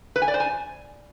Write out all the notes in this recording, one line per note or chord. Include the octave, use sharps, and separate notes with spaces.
B4
G#5
D5
C5
G#5